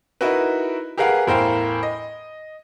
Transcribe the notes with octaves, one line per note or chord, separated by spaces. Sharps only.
D#4 E4 F#4 A#4 B4
G4 G#4 A#4 B4 F5 F#5
E2 A2 A#4 C5 F5 G5
D#5